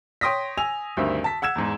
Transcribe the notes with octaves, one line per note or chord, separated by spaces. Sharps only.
C#5 G5 C6 D#6 A#6 B6
G#5 E6 F7
D2 G2 D#3 C4 E5
A5 B6
F#5 E6 G#6 E7
E2 G#2